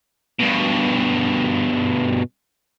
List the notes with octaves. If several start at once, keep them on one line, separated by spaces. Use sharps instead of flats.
G2 B2